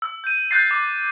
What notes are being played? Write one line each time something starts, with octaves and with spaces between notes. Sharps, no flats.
E6
G6 D#7
F#6 G6 A6 C7
D6